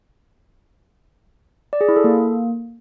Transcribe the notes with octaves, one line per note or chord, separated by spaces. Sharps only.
D5
G#4
E4
A4
A#3